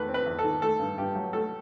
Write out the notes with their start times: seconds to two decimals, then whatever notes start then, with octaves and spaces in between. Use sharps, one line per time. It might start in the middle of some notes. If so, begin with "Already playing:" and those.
Already playing: E2 D#3 A3 B4
0.09 C4
0.14 B4
0.26 E2
0.39 A4
0.44 D#3
0.62 A3 A4
0.80 G2
0.97 G2 G4
1.16 F#3
1.33 A3 A4